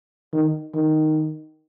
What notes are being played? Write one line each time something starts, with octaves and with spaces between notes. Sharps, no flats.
D#3
D#3